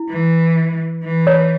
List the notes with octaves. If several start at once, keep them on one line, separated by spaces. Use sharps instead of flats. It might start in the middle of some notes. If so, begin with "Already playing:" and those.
Already playing: E4
E3
E3
C#5